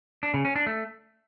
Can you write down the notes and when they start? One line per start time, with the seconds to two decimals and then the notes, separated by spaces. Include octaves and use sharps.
0.23 D4
0.34 C#3
0.45 C#4
0.56 D4
0.66 A3